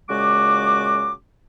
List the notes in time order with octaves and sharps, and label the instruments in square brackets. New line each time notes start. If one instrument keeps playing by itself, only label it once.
[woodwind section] A#2 C#3 G#3 F#4 D6